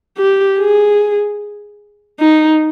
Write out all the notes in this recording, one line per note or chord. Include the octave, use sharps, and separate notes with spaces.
G4
G#4
D#4